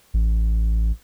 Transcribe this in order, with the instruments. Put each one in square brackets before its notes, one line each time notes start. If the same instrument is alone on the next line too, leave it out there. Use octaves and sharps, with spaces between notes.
[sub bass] A1